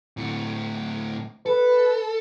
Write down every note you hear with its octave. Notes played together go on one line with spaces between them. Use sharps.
D2 A2
A4 B4